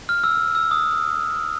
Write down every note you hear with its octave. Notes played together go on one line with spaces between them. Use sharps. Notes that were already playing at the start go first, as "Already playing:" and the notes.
F6
E6
E6
D#6